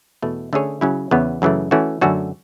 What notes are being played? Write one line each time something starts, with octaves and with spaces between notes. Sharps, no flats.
E2 B2 A3
D3 A3 C#4 G#4 C#5
C#3 F#3 C#4 E4
E2 C#3 E3 B3
F#2 C#3 E3 A3
E3 A3 C#4 F#4
F#2 D3 A3 C#4 F#4